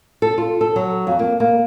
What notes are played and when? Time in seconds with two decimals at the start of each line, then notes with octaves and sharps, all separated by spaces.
0.22 A4
0.38 F4
0.61 A4
0.76 F#3
1.07 F2
1.19 A#3
1.40 A#3